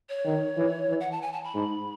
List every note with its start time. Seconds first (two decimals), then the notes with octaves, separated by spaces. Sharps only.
0.09 C#5
0.25 D#3
0.57 E3
0.89 E3
1.00 F#5
1.11 A5
1.22 G#5
1.32 A5
1.44 B5
1.55 G#2